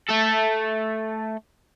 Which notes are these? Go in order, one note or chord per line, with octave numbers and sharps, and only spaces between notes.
A3 A4